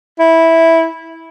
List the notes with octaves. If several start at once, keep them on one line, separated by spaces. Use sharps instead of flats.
E4